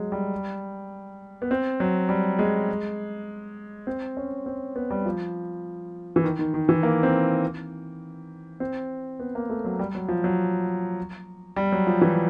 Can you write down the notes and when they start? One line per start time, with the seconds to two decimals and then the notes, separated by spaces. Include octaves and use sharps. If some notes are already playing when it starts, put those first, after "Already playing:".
Already playing: F#3 G#3
0.12 G3
1.42 B3
1.51 C4
1.80 F#3
2.09 G3
2.39 G#3
3.87 C4
4.17 C#4
4.46 C4
4.76 B3
4.90 G3
5.06 F3
6.16 E3
6.24 D#3
6.39 D#3
6.54 D#3
6.69 E3
6.83 A#3
7.03 C4
8.60 C4
9.20 B3
9.35 A#3
9.50 A3
9.65 F#3
9.79 G3
9.95 F#3
10.08 F3
10.24 F#3
11.56 G3
11.72 F#3
11.87 F3
12.01 E3